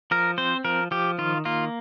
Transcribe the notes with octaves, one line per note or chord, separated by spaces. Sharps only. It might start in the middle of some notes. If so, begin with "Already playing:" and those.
F3 A#4
C4 C5
F3 A#4
F3 G4
D#3 F4
A#3 F4